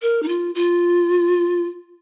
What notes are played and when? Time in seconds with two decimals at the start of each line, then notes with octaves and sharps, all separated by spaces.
0.02 A#4
0.23 D#4
0.28 F4
0.55 F4